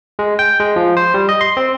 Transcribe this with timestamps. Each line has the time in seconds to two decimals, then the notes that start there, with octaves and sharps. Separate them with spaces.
0.19 G#3
0.39 G5
0.60 G#3
0.76 F3
0.97 C5
1.14 G3
1.29 D#5
1.41 C6
1.57 C4